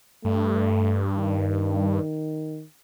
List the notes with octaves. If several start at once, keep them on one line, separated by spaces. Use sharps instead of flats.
G2 A3
D#3